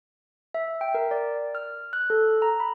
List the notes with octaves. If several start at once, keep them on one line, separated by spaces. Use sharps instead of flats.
E5
G5
A#4
D5
F6
F#6
A4
A#5
B5